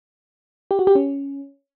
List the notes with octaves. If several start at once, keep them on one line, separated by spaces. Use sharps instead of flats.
G4
F#4
G4
C#4